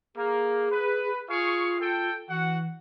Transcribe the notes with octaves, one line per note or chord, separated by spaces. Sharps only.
A#3 G#4
B4
F4 G#4 F5 C#6
A4 G5
E3 F#4 F#5